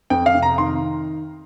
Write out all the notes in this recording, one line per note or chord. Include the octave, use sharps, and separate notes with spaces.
F2 G5
F5
C3
A#5
D#3 C6